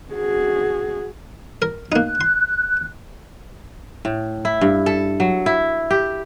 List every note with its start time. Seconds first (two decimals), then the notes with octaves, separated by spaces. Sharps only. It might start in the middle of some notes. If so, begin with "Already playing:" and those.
0.12 F#4 G#4
1.62 A#4
1.92 A#3 D#4 F#6
2.21 C6
4.05 A2
4.45 E4
4.61 G2
4.86 A4
5.20 F#3
5.46 E4
5.91 G4